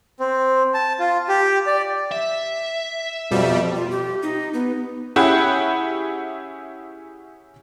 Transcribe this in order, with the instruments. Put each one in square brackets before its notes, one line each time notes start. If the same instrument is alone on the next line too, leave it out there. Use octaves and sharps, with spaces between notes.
[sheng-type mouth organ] C4
A5
F4
G4
D5
[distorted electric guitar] E5
[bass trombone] F2 [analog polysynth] B2 [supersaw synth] G3
[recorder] F4
G4
D#4
B3
[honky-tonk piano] C#4 E4 G4 G#4 E5 F#5